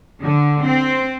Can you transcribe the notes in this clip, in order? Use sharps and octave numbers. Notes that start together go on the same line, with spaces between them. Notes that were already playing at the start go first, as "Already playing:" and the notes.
D3
C4